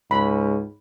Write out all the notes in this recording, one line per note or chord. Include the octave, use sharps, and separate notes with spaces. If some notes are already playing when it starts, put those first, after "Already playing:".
C#2 G#2 B5